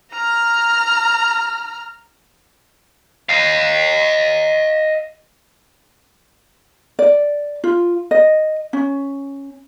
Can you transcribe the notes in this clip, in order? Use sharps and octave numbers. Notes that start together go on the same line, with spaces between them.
A#5 F6
D#5 F5
D5
F4
D#5
C#4